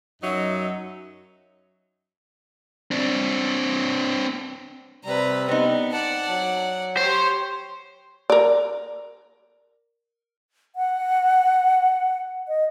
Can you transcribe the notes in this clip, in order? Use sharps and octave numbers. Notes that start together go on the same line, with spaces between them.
F#2 F#3 D#4 D#5 E5
C4 D4
C3 G3 B4 A#5
B3 C4 D#4
D5 F#5 A5
F#3
G4 C5 C#5
A#4 D5
F#5
D#5